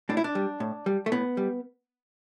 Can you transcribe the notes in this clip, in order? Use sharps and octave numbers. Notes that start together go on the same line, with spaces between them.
A2 D4
E4
D4
G3
A2
G3
A3
A2 B3
G3